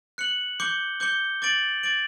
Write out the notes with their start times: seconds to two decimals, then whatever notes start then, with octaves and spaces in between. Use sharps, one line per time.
0.18 F#6 C#7 F#7
0.60 D6 G6 C#7 G7
1.00 D6 G6 C#7 G7
1.42 D6 A6 D7 F#7
1.83 D6 A6 D7 F#7